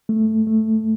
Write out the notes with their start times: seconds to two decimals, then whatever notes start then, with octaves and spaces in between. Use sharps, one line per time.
0.09 A3
0.47 A3